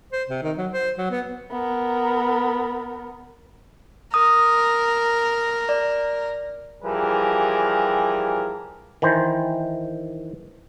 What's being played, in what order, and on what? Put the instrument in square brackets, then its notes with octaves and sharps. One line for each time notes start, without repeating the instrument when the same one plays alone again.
[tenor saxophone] C5
C3
D#3
F#3
C5
F#3
B3
[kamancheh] B3 A#4
[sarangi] A#4 [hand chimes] D#6
[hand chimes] D5
[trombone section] E3 F3 G3 G4 G#4 A#4
[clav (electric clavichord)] D#3 E3 C5